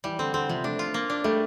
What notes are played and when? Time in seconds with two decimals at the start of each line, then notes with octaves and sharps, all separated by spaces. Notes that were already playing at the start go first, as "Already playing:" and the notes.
0.04 E3 G3
0.19 D3 C4
0.34 D3 C4
0.49 C3 F3
0.64 A3 D4
0.79 F4
0.94 A#3
1.10 D4
1.24 G3 A3